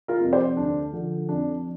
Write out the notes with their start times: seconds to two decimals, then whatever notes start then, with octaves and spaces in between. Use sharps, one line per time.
0.08 F4 A#4
0.21 F2 C3 G3
0.32 G4 C5
0.56 D2 D4
0.93 D3 F3
1.29 F2 D4